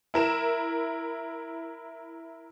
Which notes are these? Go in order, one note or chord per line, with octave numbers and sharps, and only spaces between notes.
E4 A#4 E7